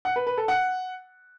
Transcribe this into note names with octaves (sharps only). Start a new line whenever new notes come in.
F#5
B4
B4
A4
F#5